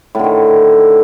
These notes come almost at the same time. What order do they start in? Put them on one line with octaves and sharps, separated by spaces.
A2 D3 D#3